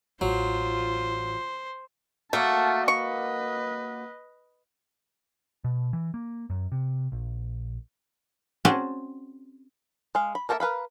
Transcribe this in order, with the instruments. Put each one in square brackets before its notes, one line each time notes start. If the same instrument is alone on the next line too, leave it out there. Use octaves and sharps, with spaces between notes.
[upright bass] A1 [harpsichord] F#3 [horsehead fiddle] F4 [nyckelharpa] C5
[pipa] A3 [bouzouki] A#3 F#4 A#4 [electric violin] A5
[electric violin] B4 D#5 [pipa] C#6
[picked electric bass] B2
E3
A#3
F#2
C3
A#1
[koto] C4 C#4 F#4 G#4 D5 A5
[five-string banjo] G#3 F5
B5
A#3 A4 A#4 C5 E5
A#4 B4 F5 B5